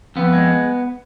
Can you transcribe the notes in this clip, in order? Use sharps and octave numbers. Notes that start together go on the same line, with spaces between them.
F2 B3
G#3